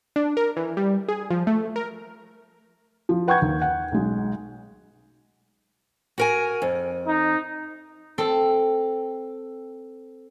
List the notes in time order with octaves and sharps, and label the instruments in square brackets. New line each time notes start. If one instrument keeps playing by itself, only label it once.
[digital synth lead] D4
A#4
E3
G3
G#4
F3
A3
A#4
[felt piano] F3
B4 F#5 G5 C#6 G6 G#6
D#2
F#5
B1 G#3
[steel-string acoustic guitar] F#4 A#4 G#5
F2
[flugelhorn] D#4
[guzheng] C4 A4